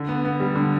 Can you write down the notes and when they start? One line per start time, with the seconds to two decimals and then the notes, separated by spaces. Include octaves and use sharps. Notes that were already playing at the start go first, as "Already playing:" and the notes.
Already playing: D3
0.08 B3
0.24 B3
0.40 G3
0.55 D3